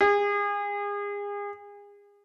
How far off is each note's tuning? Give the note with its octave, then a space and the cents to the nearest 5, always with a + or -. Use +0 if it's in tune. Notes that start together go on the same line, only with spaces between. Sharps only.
G#4 -35